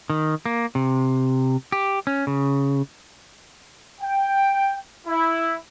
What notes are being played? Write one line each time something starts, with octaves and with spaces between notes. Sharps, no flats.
D#3
A#3
C3
G4
C#4
C#3
G5
E4